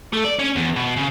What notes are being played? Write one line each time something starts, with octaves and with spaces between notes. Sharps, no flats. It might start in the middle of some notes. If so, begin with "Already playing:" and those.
A3
D5
C#4
E2
B2
C#3